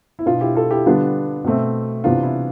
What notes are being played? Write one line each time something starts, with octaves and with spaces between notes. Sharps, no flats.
E4
B2 B3 D4 F4
E4 G4
F4 A4
E4 G4
D3 G3 B3 D4 F4
B2 A3 C4
C3 E3 B3 D4 F4
E4